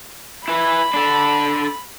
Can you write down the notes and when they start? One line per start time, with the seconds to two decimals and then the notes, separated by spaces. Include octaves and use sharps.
0.48 E4 B4 B5
0.94 D4 A4